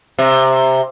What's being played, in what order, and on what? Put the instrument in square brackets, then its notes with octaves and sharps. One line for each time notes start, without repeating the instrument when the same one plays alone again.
[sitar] C3